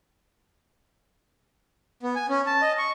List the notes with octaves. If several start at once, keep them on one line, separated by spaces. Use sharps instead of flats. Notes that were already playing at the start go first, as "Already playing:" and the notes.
B3
G#5
C#4
A5
D#5
C#6